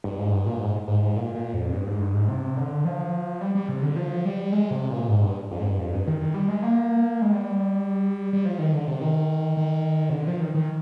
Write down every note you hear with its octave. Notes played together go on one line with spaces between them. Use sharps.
G2
G#2
G2
A#2
G#2
G#2
G#2
A#2
A#2
F2
G2
G#2
G2
G#2
C3
D3
F3
G3
G3
C3
D3
F3
G3
G#3
C3
A#2
G#2
G2
F2
G#2
G2
F2
G2
D#3
D#3
G3
G#3
A#3
G#3
G3
G3
F3
D#3
D3
C3
D#3
D#3
C3
D3
F3
D#3
D#3